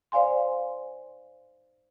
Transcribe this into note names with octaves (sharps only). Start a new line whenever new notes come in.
C5 D5 F5 G#5 C6